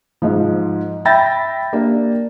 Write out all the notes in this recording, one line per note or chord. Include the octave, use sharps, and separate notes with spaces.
G#2 F3
E5 G5 B5 G6 A6 A#6
A#3 D4 G4